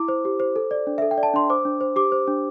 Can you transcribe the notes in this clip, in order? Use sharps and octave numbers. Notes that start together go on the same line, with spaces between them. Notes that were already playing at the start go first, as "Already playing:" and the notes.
Already playing: E4 D6
C5
G4
C5
A4
D5
D4
A4 E5
G5
D5
A5
D4 C6
C5 D6
D4
C5
G4 D6
C5
D4